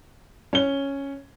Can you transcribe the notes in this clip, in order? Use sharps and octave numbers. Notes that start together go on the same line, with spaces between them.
C#4 G7